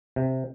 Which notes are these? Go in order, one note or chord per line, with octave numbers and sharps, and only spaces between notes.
C3